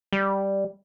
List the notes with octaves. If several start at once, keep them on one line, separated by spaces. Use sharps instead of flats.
G3